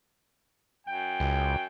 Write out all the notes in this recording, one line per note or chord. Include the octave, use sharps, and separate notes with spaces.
F#2 G5
C#2